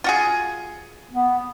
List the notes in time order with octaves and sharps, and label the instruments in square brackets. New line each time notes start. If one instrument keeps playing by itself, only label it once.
[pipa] F4 F#4 G#4
[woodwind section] B3